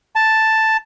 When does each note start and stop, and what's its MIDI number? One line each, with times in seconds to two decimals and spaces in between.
0.15 0.77 81